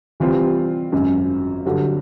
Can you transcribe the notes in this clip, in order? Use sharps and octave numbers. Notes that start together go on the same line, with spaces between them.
C3 E3 G3 C4 F4
G#1 F#2 C#3
G2 D3 F#3